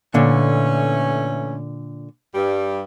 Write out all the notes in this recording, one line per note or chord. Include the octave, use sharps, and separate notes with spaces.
A#2 D3 E3 A3 C#4
G2 G3